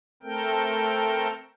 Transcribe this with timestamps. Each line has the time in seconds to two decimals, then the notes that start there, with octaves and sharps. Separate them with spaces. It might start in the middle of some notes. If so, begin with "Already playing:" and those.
0.23 A3 C4 A4 A#4 G5